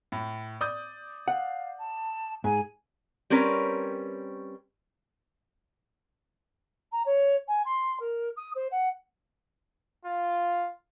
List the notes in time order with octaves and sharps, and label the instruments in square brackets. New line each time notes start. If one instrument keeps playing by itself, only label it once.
[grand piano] A2
D5 D#6 G6
[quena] F5 [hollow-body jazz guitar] F#5
[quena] A5
[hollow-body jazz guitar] G#2 [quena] G#5
[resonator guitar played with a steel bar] G3 C4 C#4 A#4 B4 C#5
[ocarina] A#5
C#5
G#5
C6
A#4
D#6
C5
F#5
[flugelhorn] F4